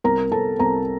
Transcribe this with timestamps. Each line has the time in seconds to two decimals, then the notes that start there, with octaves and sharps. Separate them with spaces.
0.04 C2 A#4 A#5
0.31 C2 A4 A5
0.60 C2 A#4 A#5